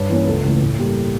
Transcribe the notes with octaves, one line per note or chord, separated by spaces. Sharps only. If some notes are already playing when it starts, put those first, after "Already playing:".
Already playing: G2 C#5
E3 A#3 C#4
C#2 A4
C#3 E3 A3
A2
G3 A#3